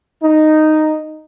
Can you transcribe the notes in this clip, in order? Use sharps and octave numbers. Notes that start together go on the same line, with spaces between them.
D#4